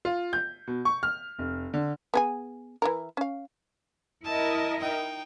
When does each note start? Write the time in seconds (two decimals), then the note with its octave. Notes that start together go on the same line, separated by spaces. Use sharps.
0.05 F4
0.33 G6
0.67 B2
0.85 C#6
1.03 F6
1.39 F1
1.74 D3
2.14 B3 G#4 G#5
2.82 E3 E4 A#4
3.17 C#4 F5
4.24 E4 A#4 D#5 A5
4.80 D#4 G5